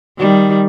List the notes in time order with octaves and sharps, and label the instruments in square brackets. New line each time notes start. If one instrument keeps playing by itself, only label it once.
[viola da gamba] D#3 G3